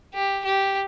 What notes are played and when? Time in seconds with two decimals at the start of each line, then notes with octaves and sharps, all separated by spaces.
0.14 G4
0.45 G4